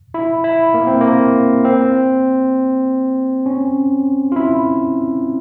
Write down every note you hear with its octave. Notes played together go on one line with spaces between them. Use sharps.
E4
E4
A#3
C4
A#3
C4
C#4
F4
E4